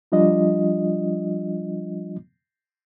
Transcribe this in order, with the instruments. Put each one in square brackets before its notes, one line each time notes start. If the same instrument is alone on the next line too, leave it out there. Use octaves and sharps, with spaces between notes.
[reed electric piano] F3 G3 D4 F4 D#5